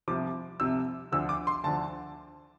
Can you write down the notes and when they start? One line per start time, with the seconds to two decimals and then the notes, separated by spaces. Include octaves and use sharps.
0.08 C2 C3 F3 D6
0.60 C2 C3 F3 E6
1.12 D2 D3 F3 E6
1.29 D6
1.47 C6
1.64 D2 D3 F3 A5